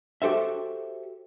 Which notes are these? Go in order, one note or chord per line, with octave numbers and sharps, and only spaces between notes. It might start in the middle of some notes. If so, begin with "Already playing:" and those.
F#4 G4 A4 C5 E5